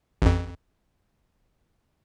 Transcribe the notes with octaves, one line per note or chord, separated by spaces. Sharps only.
A1 F2